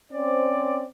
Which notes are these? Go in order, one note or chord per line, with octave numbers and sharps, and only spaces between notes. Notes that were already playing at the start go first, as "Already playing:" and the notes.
C4 C#4 C5 D5